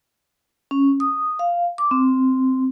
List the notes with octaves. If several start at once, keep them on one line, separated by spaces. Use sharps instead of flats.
C#4
D#6
F5
D6
C4